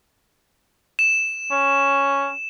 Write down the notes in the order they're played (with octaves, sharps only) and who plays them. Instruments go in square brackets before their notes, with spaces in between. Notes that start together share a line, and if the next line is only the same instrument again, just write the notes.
[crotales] E7
[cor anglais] C#4